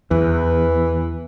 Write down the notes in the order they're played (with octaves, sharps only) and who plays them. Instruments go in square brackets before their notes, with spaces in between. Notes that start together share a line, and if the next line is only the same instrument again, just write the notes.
[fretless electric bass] E2 [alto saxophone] E3